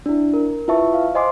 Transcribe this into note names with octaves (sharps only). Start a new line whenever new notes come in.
D4 E4
A#4
E4 F4 B4 E5 A5 C#6
F5
C5 D#5 G#5 C6 D6